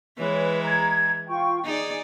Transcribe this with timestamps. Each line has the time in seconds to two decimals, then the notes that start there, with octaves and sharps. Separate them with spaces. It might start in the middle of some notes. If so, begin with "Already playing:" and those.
0.18 E3 G#3 B4 C#5
0.62 A#5 G#6
1.28 F4 G5 C#6
1.64 D#4 G#4 D5